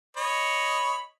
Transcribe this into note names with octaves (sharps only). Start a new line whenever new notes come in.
C#5 D#5 B5